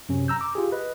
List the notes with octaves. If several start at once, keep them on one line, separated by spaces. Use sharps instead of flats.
F#2 C3 C#4
A#5 E6 G6
D6
F4 G4 G#4
B4 D#5